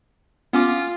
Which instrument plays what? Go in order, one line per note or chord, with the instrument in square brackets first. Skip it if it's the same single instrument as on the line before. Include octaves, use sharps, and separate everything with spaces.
[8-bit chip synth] B3 C#4 D6 [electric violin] F4